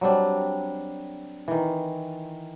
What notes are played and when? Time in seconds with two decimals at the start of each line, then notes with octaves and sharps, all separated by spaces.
0.01 F#3 G3 C4 D4
1.48 D#3 E3